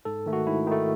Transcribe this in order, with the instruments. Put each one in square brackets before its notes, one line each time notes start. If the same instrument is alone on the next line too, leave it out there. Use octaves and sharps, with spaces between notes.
[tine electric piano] G#2 A4
D#3 A3
F#4
G#2 E4
D#3 A3 D#4